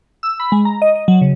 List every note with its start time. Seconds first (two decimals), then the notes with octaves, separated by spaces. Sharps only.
0.23 E6
0.40 B5
0.52 G#3
0.65 A#5
0.82 D#5
0.96 D#5
1.08 F#3
1.21 C#3